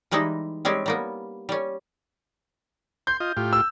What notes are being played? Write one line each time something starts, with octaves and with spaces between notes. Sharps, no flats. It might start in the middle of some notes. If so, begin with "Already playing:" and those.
E3 G3 G#3 D#4 E4
G3 G#3 C4 C#4
G3 A#3 B3
G3 C#4
C6 G6
F4 D#5
A2 F4 G4
E6